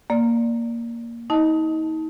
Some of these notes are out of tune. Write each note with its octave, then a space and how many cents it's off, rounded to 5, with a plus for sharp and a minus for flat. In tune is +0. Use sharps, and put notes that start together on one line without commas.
A#3 +0 D5 -5
D#4 +35 D#5 +0 A5 +0